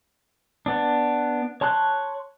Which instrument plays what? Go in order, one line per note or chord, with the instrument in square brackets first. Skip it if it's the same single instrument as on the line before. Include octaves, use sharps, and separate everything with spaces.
[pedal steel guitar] B3 D4
C#5 A5 C6 F#6